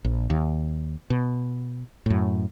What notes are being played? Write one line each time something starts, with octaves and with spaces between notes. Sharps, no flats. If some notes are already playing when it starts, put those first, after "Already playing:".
A#1
D#2
B2
F#2 A2